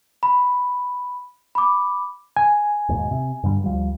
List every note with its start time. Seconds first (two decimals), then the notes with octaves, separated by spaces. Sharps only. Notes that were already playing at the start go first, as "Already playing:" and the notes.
0.23 B5
1.55 B5 D6
2.37 G#5
2.89 E1 D#2 G#2
3.11 C3
3.44 G2 D3 G3
3.64 D2 F3 G3